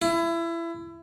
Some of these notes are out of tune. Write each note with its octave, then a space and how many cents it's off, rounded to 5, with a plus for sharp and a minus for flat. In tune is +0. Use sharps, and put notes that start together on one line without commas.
E4 +25